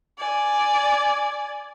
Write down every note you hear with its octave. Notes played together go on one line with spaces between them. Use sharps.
D5 G#5